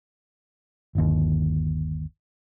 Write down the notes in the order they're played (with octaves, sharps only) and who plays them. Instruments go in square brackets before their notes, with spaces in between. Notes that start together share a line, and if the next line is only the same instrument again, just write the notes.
[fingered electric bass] G1 D#2